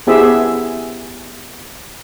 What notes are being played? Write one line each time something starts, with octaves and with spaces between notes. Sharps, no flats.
B3 E4 G4 G#4 C5 E5